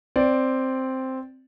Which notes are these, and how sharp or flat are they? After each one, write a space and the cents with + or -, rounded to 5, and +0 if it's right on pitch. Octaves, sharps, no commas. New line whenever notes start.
C4 +0 D5 +0